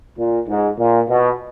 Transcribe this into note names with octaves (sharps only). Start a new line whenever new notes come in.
A#2
G#2
A#2
B2